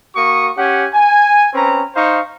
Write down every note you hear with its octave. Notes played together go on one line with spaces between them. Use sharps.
A#3 F#4 C#6 D#6
C#4 G4 F#5 G#5
G#5
C4 C#4 B4 A#5
D#4 C5 F5 C#6